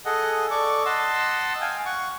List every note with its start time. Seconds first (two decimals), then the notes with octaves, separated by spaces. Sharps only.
0.05 G#4 A4 D#5 F#5
0.51 A4 D5 C#6 D6
0.86 D#5 F#5 A5 C6 E6
1.61 F5 G5 G#5
1.86 F#5 C#6